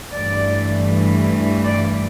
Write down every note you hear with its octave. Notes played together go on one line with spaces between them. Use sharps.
G2 E3 A3 D5
D5